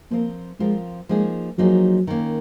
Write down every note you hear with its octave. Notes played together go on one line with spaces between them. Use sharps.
F3 A#3 C4 F4 A#4
F3 G#3 C4 F4 A#4
F3 G#3 A#3 D#4 G#4
F3 F#3 A#3 D#4 G#4
D#3 A#3 C#4